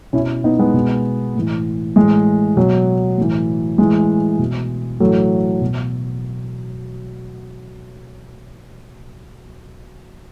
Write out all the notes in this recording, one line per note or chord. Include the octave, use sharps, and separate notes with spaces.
B2 C#4 E4
B3 D#4
G#3 B3
B2
A2 E3
A2 E3 G#3
B2 F#3
A2 E3
A2 E3 G#3
B2
A2 E3 F#3 A3
B2